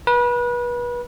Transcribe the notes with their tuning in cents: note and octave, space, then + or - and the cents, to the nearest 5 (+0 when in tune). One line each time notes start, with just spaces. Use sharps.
B4 -30